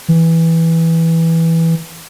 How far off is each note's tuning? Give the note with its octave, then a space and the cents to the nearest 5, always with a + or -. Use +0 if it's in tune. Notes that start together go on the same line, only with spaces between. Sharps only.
E3 -5